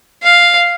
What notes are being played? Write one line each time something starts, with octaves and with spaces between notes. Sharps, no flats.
F5